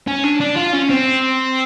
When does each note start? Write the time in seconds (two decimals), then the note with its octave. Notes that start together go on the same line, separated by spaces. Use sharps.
0.07 C#4
0.24 D4
0.40 D4
0.56 F4
0.73 C#4
0.89 C4